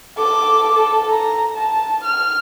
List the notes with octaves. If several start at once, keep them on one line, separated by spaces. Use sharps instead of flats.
A4 D6
A4
A#5
A5
F6